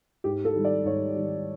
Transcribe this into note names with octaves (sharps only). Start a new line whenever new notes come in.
G#2 G4
A4
D#3 G3
D5
G#2 C#5
D#3 G3